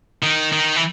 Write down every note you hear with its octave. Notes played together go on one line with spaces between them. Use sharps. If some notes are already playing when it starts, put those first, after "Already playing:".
D#3
D#3
E3